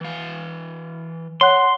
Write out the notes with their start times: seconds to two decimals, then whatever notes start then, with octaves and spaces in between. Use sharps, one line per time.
0.01 E3 F5
1.41 C#5 F#5 C6 F#6